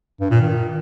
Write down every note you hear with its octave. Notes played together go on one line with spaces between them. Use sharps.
G2
A#2
D#3